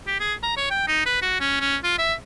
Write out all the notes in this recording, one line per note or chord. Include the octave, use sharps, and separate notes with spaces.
G4
G#4
A#5
C#5
G5
D#4
B4
F#4
C#4
C#4
F4
E5